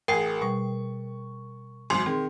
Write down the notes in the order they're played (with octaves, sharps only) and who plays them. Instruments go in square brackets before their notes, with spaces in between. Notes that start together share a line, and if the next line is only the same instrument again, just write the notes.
[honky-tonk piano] A1 [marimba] G#4 G#5 [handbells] A#4 G5 C7
[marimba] B2 G3 [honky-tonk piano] C#6
[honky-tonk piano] G#1 F#2 [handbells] C6
[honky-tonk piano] D#3 [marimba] C4 G#4